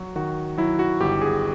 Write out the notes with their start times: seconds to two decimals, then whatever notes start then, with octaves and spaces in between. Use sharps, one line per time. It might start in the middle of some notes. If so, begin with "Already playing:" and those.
Already playing: F#3 F#4
0.16 D#3 F#4
0.58 F#3 E4
0.79 F#4
1.00 G1 G4
1.22 G#4